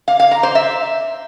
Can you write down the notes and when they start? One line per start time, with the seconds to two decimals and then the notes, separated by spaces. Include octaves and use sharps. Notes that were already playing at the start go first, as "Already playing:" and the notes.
0.08 F5
0.20 F5
0.31 A#5
0.43 C5
0.55 E5